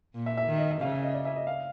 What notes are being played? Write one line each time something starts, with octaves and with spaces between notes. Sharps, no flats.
A#2
E5
E5
D#3
D#5
E5
C#3 F5
E5
D#5
D5
E5
D#5
F5